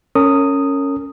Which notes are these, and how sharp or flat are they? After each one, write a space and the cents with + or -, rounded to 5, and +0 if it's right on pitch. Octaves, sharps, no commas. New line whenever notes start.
C#4 +0 A#4 -35 D#6 +0